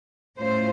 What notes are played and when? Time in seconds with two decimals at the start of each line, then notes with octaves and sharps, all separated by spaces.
0.38 A2 A3 C#4 F4 C5